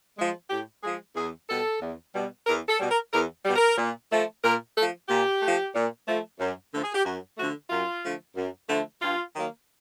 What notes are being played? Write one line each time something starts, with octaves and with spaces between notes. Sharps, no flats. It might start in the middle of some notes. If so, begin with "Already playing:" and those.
F3 G#3
A2 G4
F3 G#3 G#4
E2 G#4
B2 G3 A4
E2
B2 G3
E2 A#4
A4
B2 G3
A#4
E2 A#4
B2 G3
A#4
A#2
F3 A3
A#2 A#4
F3 A3 A4
A#2 G4
F3 A3
A#2
F3 A3
F#2
D3 F3 A3 A4
G#4
G4
F#2 F#4
D3 F3 A3 F#4
F#2 F4
D3 F3 A3
F#2
D3 F3 A3
G2 F4
D#3 F#3 A#3